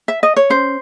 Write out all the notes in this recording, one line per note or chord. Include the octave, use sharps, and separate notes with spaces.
E5
D#5
C#5
C#4 C5